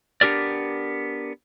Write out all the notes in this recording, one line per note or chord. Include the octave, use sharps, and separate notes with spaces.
B3 D4 G4 A#4 D5